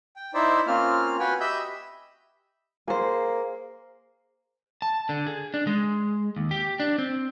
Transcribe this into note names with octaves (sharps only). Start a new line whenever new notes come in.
G5
D#4 E4 C5 D5 E5
A#3 C4 C#4 F4 F6
F#4 B4 G5 G#5
G4 D#5 E5 B5 E6 G6
A#3 G#4 C5
A5
D3
G#4
D4
G#3
D#2
G4
D4
C4